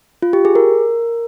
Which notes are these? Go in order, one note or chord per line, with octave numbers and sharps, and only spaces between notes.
F4
G4
G#4
A#4